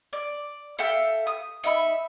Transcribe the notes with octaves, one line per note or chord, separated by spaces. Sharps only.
D5
A4 E5 F5 G5
D#6
D#4 E5 B5